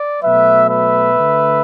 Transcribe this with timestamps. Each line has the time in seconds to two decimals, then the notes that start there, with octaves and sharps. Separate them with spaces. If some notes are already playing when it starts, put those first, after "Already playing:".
Already playing: D5
0.22 B2 F#3 A3 B4 E5
0.68 B4 E5
1.14 D3 A3